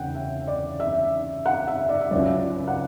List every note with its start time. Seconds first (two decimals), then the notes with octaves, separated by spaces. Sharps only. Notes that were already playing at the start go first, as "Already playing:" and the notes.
Already playing: E2 C#3 F#5 G5
0.15 E5
0.47 D5
0.80 E5
1.46 F#5
1.68 E5
1.89 D5
2.01 E5
2.11 C#2 C#3 F#3 D5
2.68 F#5